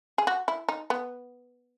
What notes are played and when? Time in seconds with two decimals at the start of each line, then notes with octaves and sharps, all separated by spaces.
0.18 G#4
0.27 F#4
0.48 E4
0.69 D#4
0.90 B3